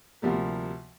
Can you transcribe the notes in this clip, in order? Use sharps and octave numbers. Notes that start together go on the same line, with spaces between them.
D2 C3 F3 G3 A#3